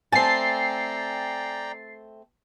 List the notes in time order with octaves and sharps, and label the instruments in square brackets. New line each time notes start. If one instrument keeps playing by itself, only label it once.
[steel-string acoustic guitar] A3 C4 [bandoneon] D5 G5 A#5 [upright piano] G#5 [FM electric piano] A6 C7